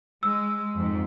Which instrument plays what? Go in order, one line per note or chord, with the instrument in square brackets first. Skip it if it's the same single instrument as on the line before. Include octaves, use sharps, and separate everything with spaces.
[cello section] G#3 [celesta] E6
[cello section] F2 G#2